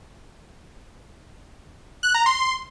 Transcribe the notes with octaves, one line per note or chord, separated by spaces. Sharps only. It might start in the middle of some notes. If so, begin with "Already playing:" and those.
F#6
A#5
C6